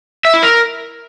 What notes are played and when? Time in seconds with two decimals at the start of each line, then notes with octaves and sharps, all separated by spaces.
0.25 E5
0.34 E4
0.43 A#4